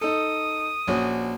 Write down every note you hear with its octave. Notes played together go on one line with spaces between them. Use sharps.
D#4 A4 D#6
A#1 C#4 F#4